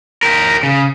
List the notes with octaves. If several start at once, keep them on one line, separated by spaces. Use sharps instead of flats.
G4 A#4
C#3